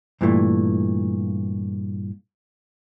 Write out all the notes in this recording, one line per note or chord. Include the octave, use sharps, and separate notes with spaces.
G2 A#2 E3 G#3 A3